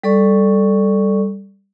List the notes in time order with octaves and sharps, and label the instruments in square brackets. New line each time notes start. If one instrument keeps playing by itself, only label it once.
[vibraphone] G3 A4 D5 C#6